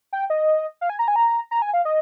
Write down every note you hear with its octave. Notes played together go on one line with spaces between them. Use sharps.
G5
D#5
F5
G#5
A#5
G#5
A#5
A#5
G#5
F5
D#5